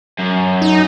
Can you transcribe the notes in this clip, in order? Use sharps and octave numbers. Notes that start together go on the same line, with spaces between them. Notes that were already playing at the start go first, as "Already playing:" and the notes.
F#2
D#4